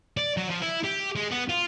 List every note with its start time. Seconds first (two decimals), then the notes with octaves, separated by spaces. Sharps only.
0.17 D5
0.37 F#3
0.50 F3
0.62 E4
0.84 G4
1.16 G#3
1.31 B3
1.49 F4